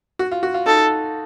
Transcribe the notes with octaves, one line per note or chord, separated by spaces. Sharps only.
F#4
F4
F#4
F4
D#4 A4